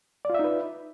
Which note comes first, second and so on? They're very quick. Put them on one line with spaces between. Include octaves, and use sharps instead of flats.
D5 F4 E5 D#4 B4